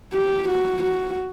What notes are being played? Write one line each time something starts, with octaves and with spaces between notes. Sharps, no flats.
G4
F#4
F#4